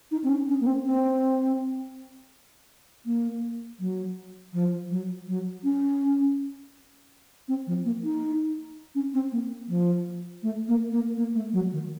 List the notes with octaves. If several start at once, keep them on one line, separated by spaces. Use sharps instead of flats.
D#4
C4
C#4
C#4
A#3
C4
C4
A#3
F#3
F3
F#3
F#3
C#4
C4
F3
A#3
D#4
C#4
C4
A#3
F3
A3
A#3
A#3
A#3
A3
F#3
D#3